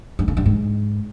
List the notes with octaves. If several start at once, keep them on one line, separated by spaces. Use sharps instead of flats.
G2
C#3
G2
G#2